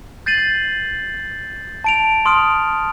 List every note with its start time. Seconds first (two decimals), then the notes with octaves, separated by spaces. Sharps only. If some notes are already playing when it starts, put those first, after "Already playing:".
0.26 G6 A6 C7 D#7 F#7
1.84 A5 D7 F7
2.26 C6 D#6 F6 D7 F7